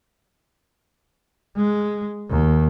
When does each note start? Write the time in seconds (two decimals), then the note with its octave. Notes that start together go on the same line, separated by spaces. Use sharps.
1.57 G#3
2.29 D#2